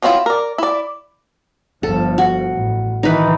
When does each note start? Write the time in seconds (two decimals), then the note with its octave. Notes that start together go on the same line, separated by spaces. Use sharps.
0.02 F3 F#3 C4 E4 F4
0.26 A#4 D5
0.58 E4 D5
1.83 G1 F3 A4
2.18 F#4
2.51 A1
3.03 D#3 E3 D#4 B4